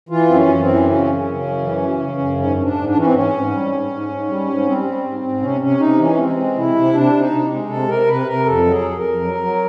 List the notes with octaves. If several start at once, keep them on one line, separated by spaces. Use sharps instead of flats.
E3 F4
F#2 C4
C#4
F#2
C4
E3
C#3 C#4
F#2
C#3
F#2
E3
C#3
C#3
F#2
G#2 C#4
G#2 C#4
D4
G#2
D4
E3 C#4
C4
G#2 C#4
G#2
G3
G#2
G#2
G#2
G3
G#2
G3 C4
G3
G#2
G#2
C3 C#4
C3 C#4
C3 D#4
E3 C#4
G#3 C4
G#3
C3 E4
C3
C3 D4
C3
D#4
C3
G#3
C3 A4
C3 A#4
C3 B4
C3 A#4
F2 A4
F#3
G#4
F2
A#4
F2
F#3
F#3